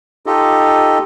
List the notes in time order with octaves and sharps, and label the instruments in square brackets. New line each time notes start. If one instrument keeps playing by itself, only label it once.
[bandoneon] D#4 F4 G4 A4 D#5